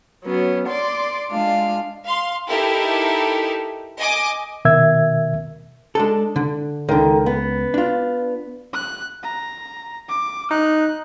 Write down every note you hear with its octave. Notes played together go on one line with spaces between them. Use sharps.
F#3 B3 C#4
D5 C6 D6
G#3 D4 F4 F5
F5 C6
D#4 E4 G4 A4 A#4
D#5 G#5 D6
B2 D#3 A#4 E5 E6 G#6
G#3 D4 A4
D3
C#2 D3 D#3
B3
D4 F4
F#6
A#5
D6
D#4 F#6